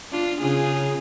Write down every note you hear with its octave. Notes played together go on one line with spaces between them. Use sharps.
D4 F4
C#3 F4 G#4